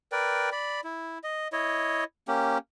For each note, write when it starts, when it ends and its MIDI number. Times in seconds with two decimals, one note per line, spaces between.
0.12 0.50 70
0.12 0.50 71
0.12 0.50 74
0.12 0.50 79
0.52 0.81 74
0.52 0.81 83
0.84 1.18 64
1.24 1.48 75
1.52 2.04 64
1.52 2.04 73
1.52 2.04 75
2.28 2.58 58
2.28 2.58 61
2.28 2.58 67